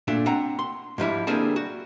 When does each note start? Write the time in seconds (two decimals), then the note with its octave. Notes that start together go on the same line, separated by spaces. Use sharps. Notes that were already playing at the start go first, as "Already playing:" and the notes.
0.08 A#2 A3 D4
0.26 C4 D4 F#5 A#5
0.59 C6
0.98 G#2 F3 G3 E4
1.27 D3 G3 A#3 C4 G#4 A5
1.56 F#4